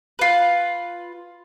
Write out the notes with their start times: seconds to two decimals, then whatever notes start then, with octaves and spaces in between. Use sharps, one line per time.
0.19 F4 B4